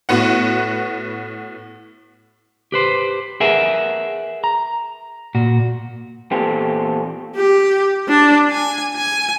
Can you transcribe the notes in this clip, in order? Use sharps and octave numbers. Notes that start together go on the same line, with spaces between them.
A2 B3 F#4 F#5
G4 B4 C5
G#4 A#4 B4 E5 F#5 G#5
A#5
A#2 F#4
E2 A#2 C4 G4 A4
G4
D4
G#5
G#5